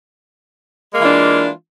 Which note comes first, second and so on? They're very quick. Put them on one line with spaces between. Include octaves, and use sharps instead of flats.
G#3 A#3 E3 F4 D4